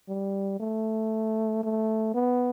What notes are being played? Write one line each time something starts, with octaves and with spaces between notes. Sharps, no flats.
G3
A3
A3
B3